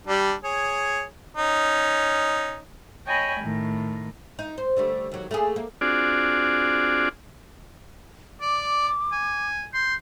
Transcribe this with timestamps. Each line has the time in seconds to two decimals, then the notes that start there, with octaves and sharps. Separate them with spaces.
0.07 G3 D4
0.44 G#4 C#5
1.37 C#4 D#4
3.07 C#5 D#5 G5 G#5 B5
3.40 A2 D#3
4.39 D#4
4.58 C5
4.77 D3 G3 A3
5.12 D#2 F#3
5.31 A3 A#3 G#4
5.56 A#3
5.81 C4 D4 F4 F#4 G#4 D5
8.41 D5 D6
9.12 G#5
9.73 C6 G6